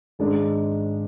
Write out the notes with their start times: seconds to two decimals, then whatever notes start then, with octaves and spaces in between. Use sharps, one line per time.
0.19 G#1 G#2 G#3 D4